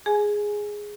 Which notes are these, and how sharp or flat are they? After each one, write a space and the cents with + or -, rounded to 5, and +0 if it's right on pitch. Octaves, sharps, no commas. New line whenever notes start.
G#4 +0 G#5 +10